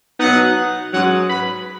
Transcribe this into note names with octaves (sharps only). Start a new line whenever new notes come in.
B2 F#3 B3 D#4 F#5
G#2 F#3 C#4 F#5
B5